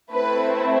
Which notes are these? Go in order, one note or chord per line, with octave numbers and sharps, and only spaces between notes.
A3 C4 E4 B4